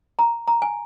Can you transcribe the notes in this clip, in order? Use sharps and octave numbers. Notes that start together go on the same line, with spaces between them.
A#5
A#5
G#5